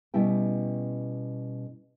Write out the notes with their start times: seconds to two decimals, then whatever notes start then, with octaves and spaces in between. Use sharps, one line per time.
0.14 B2 G3 C#4 E4 G5